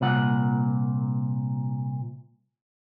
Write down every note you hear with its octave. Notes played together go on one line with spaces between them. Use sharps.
C2 A#2 F#5